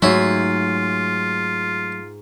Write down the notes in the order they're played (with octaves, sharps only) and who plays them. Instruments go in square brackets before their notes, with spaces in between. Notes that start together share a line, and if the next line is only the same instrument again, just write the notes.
[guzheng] G#2 E5 [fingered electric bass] F#3 A3 [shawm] F4 [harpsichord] F#4 C#5